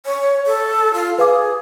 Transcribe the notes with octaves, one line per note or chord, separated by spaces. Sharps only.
C#5
A4
F4
G#4 B4 F5 D6